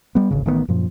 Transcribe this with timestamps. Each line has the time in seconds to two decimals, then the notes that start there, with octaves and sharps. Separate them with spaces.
0.15 G3 B3
0.31 D1 G#1 C#3
0.46 A1 D#3 A3 B3
0.68 F#2 A#2 F3